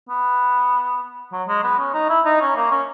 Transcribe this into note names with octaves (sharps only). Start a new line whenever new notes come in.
B3
F#3
G#3
B3
C#4
D#4
E4
D#4
C#4
A#3
C#4